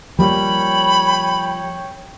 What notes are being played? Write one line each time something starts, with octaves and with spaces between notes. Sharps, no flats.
F3 G3 A#3 C#5 G5 B5